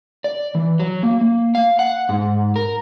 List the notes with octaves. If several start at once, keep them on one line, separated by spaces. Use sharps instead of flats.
D5
E3
F#3
A#3
A#3
F5
F#5
G#2
A#4